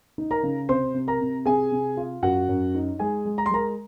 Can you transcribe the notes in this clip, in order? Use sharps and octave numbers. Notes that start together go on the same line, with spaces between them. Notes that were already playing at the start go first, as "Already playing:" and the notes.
D#4
A#4 A#5
C#3
C3 C5 C6
C3
A#4 A#5
C3
C3 G#4 G#5
C3
F4
F#2 F#4 F#5
F#2
D#4
G#3 G#4 G#5
G#3
A#5
C6
G#3 A#4 A#5